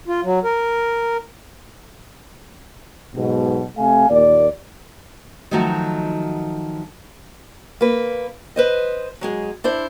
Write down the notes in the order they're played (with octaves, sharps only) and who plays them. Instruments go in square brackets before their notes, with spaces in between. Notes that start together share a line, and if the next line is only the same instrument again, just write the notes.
[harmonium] F4
F#3
A#4
[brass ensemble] B1 G#2 B2
C3 A3 F5 G#5
D#2 A#2 D5
[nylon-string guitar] D#3 F3 F#3 A3 D#4 F#4
[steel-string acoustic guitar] A#3 B4
B4 C5 D#5
F#3 G#3 G#4
D4 E4 C5